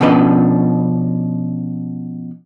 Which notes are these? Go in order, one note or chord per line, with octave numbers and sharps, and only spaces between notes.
B2 F3 C#4 D4 B4 D#5